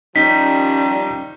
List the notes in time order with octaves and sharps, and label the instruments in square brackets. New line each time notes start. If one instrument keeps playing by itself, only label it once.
[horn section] D#3 F3 G3 [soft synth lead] C#4 [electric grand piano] D#4 [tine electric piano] B6